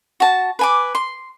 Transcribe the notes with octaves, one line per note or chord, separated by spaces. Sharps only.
F#4 A5
B4 G#5 D6
C6